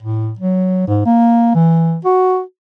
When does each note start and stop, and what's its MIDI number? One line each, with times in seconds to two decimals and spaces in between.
0.02 0.32 45
0.39 0.82 54
0.87 1.05 44
1.06 1.51 58
1.55 1.97 52
2.04 2.41 66